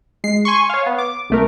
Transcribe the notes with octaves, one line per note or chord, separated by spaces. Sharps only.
G#3 C7
G#5 C6 C#6
C#5 F5
B3
D6
C2 A3 A#4